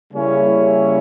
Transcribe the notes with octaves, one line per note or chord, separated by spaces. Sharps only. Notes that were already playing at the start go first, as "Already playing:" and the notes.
C#3 G3 A#3 C#4 E4